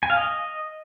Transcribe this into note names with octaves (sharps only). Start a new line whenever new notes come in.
G#5
F5
D#5